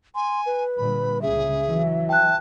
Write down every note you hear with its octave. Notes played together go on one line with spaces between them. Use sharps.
G#5 C6
B4
A#2 D3 G3 B5
C#2 C#3 G#4 E5
E3 F#3
G5 A5 F#6